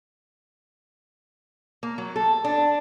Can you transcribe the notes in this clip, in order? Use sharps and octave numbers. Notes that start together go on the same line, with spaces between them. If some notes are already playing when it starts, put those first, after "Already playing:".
A#3
F#3
A4
D4